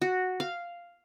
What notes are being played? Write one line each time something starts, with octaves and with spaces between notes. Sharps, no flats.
F#4
F5